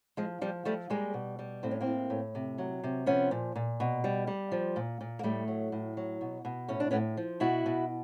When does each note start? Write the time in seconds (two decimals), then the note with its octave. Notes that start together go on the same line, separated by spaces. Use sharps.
0.17 F3 G#3
0.41 F3 G3
0.65 F3 G3 A3
0.90 G3 G#3 A#3
1.14 B2
1.39 G3
1.63 A2 C4
1.71 C#4
1.81 A#3 C4
1.86 A2
2.10 A2
2.35 C3
2.58 F#3
2.84 C3
3.06 F3 B3 C#4
3.31 A#2
3.55 A#2
3.80 B2
4.04 G3
4.27 G3
4.52 F3
4.76 A#2
5.01 A#2
5.19 A#3
5.23 A2 G3 A3
5.48 F#3
5.72 A2
5.97 F#3
6.21 B2
6.45 B2
6.68 A2 C#4
6.80 D4
6.91 A2 B3 C#4
7.17 F3
7.40 B2 E4 F#4
7.66 B2